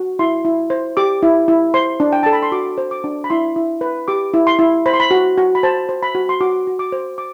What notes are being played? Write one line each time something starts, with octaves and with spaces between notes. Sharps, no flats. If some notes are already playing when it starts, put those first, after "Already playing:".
Already playing: F#4
E4 C6
E4
C5
G4 D6
E4
E4
C5 C6
D4
G5
A4 A5
B5
C6
F#4 D6
C5
D6
D4
B5
E4 C6
E4
B4
G4 D6
E4
C6
E4
C5 B5
C6
B5
F#4
F#4
B5
C5 A5
C5
B5
F#4
C6
F#4 D6
F#4
D6
C5
D6